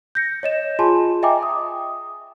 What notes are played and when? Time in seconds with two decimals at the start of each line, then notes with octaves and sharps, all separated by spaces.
0.15 G6 A#6 C#7
0.43 C#5 D#5 E7
0.79 F4 G#4 G#5 A5 C6
1.23 D#5 E5 G5 G#5 A#5 D6
1.43 D#6